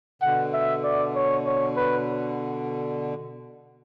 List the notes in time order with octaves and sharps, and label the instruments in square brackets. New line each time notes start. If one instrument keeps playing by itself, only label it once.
[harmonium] B2 D3 [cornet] F#5
[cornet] E5
D5
C#5
C#5
B4